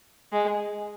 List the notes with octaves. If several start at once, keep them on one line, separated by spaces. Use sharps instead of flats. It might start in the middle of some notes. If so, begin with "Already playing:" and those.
G#3